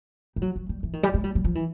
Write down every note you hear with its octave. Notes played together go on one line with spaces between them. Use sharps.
G3
F#3
F#3
G3
E3
D#3
G3
G#3
G3
F#3
F3
E3